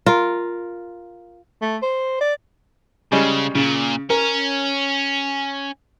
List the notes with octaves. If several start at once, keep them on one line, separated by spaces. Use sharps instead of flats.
F4 A#4
A3
C5
D5
C#3 G3 G#3 C#4
A#2 C#3
C#4 A#4